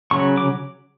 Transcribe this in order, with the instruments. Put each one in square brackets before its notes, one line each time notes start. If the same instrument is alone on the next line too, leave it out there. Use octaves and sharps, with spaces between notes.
[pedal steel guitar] C#3 F#3 C#6
D6